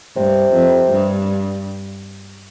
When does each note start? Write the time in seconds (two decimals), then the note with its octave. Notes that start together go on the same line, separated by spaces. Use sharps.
0.16 G2 C3
0.53 F2
0.92 G2